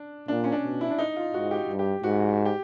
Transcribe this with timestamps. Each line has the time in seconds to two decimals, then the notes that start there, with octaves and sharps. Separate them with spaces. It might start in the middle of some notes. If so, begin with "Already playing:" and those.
Already playing: D4
0.28 A#2 D4
0.44 C#4
0.52 D4
0.63 B2
0.81 E4
0.90 D4
0.98 D#4
1.16 F4
1.34 G#2 F#4
1.51 G4
1.69 G2
1.79 G4
2.04 G#2 F#4
2.45 G4